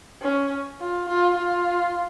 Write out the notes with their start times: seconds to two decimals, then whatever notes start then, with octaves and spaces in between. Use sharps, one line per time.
0.22 C#4
0.80 F4
1.08 F4
1.37 F4